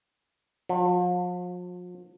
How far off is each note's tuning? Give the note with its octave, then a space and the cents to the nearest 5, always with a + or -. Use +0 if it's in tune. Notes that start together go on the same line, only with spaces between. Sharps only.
F3 +40